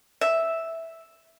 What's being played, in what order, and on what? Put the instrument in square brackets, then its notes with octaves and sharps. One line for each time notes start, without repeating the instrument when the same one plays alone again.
[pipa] E5